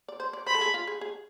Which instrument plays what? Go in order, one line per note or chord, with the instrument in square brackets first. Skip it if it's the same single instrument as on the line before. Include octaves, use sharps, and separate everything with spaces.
[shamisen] D5
C5
D5
[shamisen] C5 [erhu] B5
[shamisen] A4
G#4
F4
G#4
G#4